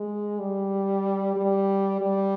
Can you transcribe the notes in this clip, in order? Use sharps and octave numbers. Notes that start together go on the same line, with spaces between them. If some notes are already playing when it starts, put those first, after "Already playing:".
Already playing: G#3
G3
G3
G3